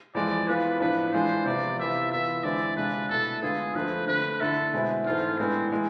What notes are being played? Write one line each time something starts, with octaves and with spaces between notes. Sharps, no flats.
F2 E3 G#3 D5
E3 B3 F4 B4
A2 F3 B3 D4 B4
E3 G#3 D4 F4 C5
C3 F3 B3 D5
C3 E3 B3 F4 E5
E3 B3 F4 E5
E2 D3 G#3 C4 E4 D5
C3 G#3 D4 F4 B4
B2 A3 E4 A4
D3 G#3 B3 F4 G#4
F2 D3 F3 A3 C4 B4
D3 A3 C4 B4
D3 A3 E4 A4
B2 G#3 C4 E4
G#2 E3 A3 C4 F4
A2 G#3 B3 C4 D4
E3 G#3